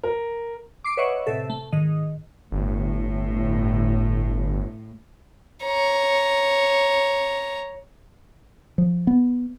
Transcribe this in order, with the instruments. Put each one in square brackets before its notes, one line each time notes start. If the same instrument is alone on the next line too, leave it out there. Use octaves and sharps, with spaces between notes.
[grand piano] A#4
[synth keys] D6 C7 D7
B4 C#5 D#5 E5 F#5 C#6
A2 C3 A4 E5
A3
G#2 D#3 D#5
[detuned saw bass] G1 [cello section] A2
[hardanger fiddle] C#5 A#5
[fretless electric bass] F3
B3